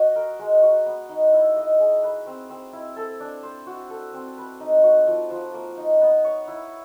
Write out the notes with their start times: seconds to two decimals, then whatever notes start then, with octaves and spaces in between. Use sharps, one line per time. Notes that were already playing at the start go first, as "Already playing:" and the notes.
Already playing: F#4 D#5
0.16 A#4
0.39 G#3
0.62 F#4
0.86 B3
1.09 D#4
1.33 E4
1.56 D#5
1.79 G#4
2.03 B4
2.27 C4
2.50 C4
2.73 E4
2.96 A4
3.20 D4
3.43 C5
3.67 F#4
3.90 A4
4.14 C4
4.37 B4
4.60 D#4
4.83 F#4
5.07 F3
5.30 F3
5.54 A#3
5.77 D#4
6.01 B3
6.24 C#5
6.48 E4